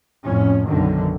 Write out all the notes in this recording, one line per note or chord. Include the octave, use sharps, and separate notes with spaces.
F2 A2 C#4
B1 F#2 D3 D#3